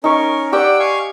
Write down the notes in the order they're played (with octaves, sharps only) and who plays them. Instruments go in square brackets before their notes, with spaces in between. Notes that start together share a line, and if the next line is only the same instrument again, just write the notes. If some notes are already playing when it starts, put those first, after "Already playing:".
[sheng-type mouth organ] C#4 A#4 [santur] D#4 C#6
[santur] G4 D5 [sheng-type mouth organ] F#5 G5 E6
[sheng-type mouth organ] F5 G#5 C#6